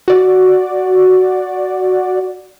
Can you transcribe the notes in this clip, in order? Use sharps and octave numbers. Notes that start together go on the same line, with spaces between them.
F#4 D5